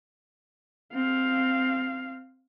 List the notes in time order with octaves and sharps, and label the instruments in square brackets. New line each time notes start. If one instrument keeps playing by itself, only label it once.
[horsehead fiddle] C4 F5